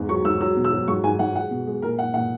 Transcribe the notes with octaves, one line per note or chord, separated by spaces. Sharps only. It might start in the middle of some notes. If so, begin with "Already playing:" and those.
Already playing: E2 G#2
F#3 C#6
G#2 E6
F#3 E6
B2
E6
F#3
G#2 C#6
G#2 G#5
G#2 F#5
G#3 F#5
B2
G#3
A#2 A#4
A#2 F#5
A#2 F#5